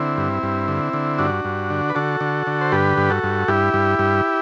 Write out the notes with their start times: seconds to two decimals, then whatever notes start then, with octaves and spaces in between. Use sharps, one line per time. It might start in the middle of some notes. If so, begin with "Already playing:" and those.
Already playing: D3 C4 E4
0.17 G2
0.43 G2
0.68 D3
0.93 D3
1.18 G2 D4 F#4
1.45 G2
1.70 D3
1.90 B4
1.95 D3 F#4 A4
2.21 D3
2.47 D3
2.61 C5
2.72 G2 G4 B4
2.97 G2
3.10 F#4 A4
3.23 G2
3.48 G2 E4 G4
3.74 G2
3.99 G2